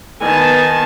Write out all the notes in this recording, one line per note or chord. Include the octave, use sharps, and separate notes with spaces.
D#3 B3 G#5 A5